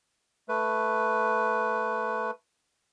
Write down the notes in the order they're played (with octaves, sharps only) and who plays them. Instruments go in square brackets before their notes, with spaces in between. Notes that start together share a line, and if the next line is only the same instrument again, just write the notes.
[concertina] A3 B4